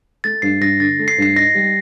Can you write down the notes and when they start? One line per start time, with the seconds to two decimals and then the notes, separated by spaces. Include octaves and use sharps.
0.24 A3 A6
0.42 G2 C7
0.61 G2 A#6
0.80 D3 A6
0.99 A3
1.08 C7
1.18 G2 C7
1.36 D#4 A#6
1.55 G3